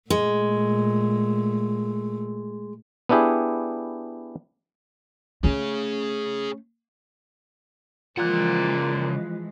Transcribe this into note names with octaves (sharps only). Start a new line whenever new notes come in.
A#2 G#3 A3
B3 D4 E4 G4 G#4
A3 C#4 G#4 C#5
A#2 C#3 E3 F3 G#3 F4 F#5 F#6